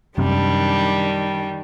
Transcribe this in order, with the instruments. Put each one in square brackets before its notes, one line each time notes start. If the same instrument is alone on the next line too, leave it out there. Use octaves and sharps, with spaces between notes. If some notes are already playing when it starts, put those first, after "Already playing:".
[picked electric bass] F#2 C3 [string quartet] D#3 G3 D4